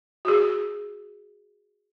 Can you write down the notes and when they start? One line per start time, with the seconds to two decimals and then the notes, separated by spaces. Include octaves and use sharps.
0.25 F#4 G#4